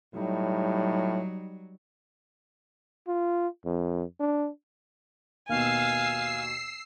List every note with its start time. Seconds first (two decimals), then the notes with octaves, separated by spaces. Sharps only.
0.15 A2 F#3 G3 D#4
3.08 F4
3.65 F2
4.20 D4
5.49 D#2 B2 F5 G#5 E6 C7